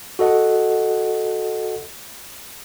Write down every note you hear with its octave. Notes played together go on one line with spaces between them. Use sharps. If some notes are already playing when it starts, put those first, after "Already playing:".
F#4 A4 D#5 F#5